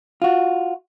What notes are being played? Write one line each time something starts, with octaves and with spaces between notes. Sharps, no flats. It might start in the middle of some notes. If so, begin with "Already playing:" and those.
F4 F#4